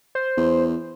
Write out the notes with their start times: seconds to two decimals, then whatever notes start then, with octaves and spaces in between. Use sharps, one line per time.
0.15 C5
0.37 E2